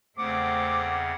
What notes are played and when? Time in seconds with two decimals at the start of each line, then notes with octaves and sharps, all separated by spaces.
0.18 E2 C#3 A3 C4 F#5 D6